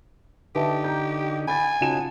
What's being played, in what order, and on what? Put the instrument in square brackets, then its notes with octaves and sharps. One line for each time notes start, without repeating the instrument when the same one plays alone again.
[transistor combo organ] D3 D#4 [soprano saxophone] G4 [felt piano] B4 E5 A5
[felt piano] A#5 G6
[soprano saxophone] G#5 [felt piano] B5 A6
[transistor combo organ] C#3 D#4 F#4 [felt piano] F4 A5 E7